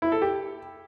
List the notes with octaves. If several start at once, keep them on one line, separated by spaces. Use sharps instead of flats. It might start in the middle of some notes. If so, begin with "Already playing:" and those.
E4
A4
G4